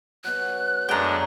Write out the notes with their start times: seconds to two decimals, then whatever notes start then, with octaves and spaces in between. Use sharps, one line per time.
0.24 B2 F#3 F#6
0.89 F#2 D3 G#3 A3 C#4 D4 G5 A#5